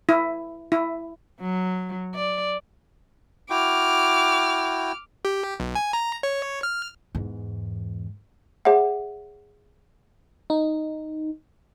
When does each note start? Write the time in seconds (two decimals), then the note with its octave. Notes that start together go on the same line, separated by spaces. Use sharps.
0.09 E4
0.72 E4
1.40 F#3
2.15 D5
3.50 E4 F#4 G5 D6 F6
5.25 G4
5.60 B1
5.75 G#5
5.93 A#5
6.23 C#5
6.63 F6
7.15 E2 G#2
8.65 G#4 C#5 E5 F#5
10.50 D#4